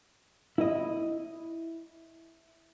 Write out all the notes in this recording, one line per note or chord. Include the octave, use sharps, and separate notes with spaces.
E4 D#5